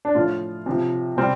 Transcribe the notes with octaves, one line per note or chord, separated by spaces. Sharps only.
D4
A2 F3 F4
C3 F3
C3 G3 C4